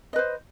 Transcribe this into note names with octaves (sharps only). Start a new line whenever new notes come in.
B4 C5 D#5